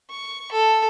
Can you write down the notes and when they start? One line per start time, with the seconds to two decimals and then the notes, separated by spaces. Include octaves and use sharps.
0.10 C#6
0.52 A4